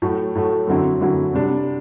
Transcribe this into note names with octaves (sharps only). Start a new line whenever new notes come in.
A2 F#3 A3
A2 F#3 A3
F#2 D3 F#3 C4 E4
F#2 D3 F#3 C4 E4
C3 G3 D4